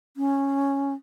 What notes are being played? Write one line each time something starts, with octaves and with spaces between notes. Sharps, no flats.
C#4